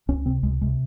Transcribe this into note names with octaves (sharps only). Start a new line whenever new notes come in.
C#2 C#4
C3 C4
C#2 G#3
C3 G#3